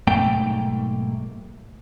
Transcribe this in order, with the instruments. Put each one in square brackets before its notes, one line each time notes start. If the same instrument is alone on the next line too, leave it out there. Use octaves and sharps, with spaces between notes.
[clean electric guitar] B1 G#2 A3 A#3 G5